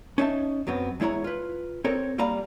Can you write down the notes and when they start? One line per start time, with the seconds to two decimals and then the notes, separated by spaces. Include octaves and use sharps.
0.18 C#4 D#4 E5 A5
0.67 F#2 F#3 B3 C4
1.00 E2 G#3 E4 C#5 A#5
1.24 F4 B4
1.84 C4 A4 A#4 C#5
2.18 G3 A#3 D5 F5 A#5 B5